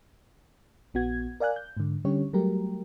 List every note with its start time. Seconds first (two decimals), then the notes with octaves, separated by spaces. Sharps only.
0.94 A#1 B3 F#4 G#6
1.40 A#4 D5 F5 G#5 F#6
1.56 G6
1.77 G#2 D3
2.05 D3 G3 C#4 G4 C#5
2.33 F#3 G3 A3 G4 A#4